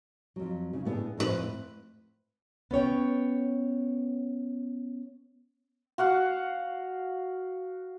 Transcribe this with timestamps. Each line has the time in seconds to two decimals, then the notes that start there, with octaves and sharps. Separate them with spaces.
0.36 F2 F#3
0.73 C#3
0.85 A2 B3 D4 G#4
1.18 F2 A2 D#4 B4 C5
2.71 B3 C#4 C#5 G5
5.98 F#4 F5 F#5